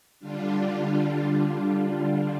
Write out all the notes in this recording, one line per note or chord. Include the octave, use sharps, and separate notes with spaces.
D3 G3 D4 F4